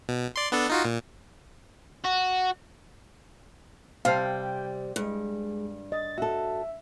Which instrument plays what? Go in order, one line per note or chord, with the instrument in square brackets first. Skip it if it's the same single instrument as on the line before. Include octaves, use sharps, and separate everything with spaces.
[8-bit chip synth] B2
D5 C6
B3 D4 A4
D#4 F4 F#4
A#2
[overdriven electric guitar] F#4
[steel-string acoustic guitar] C3 G3 [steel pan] F5 A5 [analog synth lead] G5
[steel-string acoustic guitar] G2 [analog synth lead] G#3
[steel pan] D#5 [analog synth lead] A6
[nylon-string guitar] F#4 A4 [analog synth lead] E5